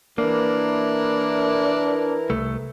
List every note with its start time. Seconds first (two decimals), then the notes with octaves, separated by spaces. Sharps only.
0.18 E3 A#3 D4 E4 A#4
2.30 C2 A3